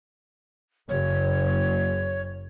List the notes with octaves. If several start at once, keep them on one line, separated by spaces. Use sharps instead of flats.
F#1 C#5